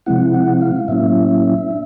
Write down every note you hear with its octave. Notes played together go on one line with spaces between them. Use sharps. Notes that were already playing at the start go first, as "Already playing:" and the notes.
C3 F3 G#3 C4 E4 F#5
F#5
F5
A2 F#3 A#3 C#4 E4 E5
D4